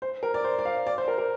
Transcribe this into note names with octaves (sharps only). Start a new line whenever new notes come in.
C5
A#4
D5
C5
D5
F5
D5
C5
A#4
A#4